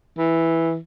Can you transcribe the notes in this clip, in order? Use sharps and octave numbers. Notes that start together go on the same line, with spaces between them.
E3